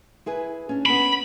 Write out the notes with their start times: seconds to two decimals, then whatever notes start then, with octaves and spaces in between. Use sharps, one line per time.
0.26 E4 G#4 B4
0.69 C#4 D4
0.86 B3 C#4 B5